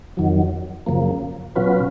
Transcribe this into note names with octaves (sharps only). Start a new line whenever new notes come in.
F2 D#3 F#3
F#2 C#3 F3 A#3
B2 F#3 C#4 F4 B4